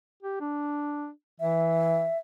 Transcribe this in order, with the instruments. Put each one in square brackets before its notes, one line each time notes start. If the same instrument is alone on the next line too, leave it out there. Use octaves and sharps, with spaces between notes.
[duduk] G4
D4
[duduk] E3 [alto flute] E5